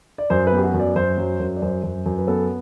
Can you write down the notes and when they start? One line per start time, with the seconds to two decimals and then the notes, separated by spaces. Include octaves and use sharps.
0.18 D5
0.30 F#2 C5
0.47 B4
0.52 B3
0.57 G4
0.64 F#4
0.74 F#2
0.80 D5
0.96 F#2 C5
1.17 F#3
1.40 F#2
1.57 D5
1.62 F#2 C5
1.84 F#2
2.06 F#2
2.18 B4
2.28 B3 A4